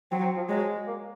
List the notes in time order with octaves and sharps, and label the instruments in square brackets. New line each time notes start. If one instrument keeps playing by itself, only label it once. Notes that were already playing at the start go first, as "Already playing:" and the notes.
[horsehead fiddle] F#3 [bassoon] C4
[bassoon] C4
F3
[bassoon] F#3 [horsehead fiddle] G#3
[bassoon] A#3